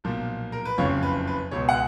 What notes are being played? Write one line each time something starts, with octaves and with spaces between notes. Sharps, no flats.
B1 A#2 F3
A#4
B4
F#1 F2 C#3 F3 C#5
B4
B4
C#2 B2 C#5
F#5